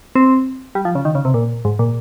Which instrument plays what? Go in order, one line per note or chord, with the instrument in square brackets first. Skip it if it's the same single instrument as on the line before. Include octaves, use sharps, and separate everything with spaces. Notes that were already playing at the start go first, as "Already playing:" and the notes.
[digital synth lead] C4
G3
F3
C#3
D#3
C#3
C3
A#2
G#2
A#2